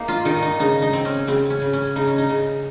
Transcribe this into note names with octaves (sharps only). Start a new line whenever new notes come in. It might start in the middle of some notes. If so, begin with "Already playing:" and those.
Already playing: A#3 D#4
F4
D#3 D#4
D#4
C#3 D#4
D#4
C4
C#4
C#3 C4
C#4
C#3
C#4
C#3 D#4
C#4
D#4
C#3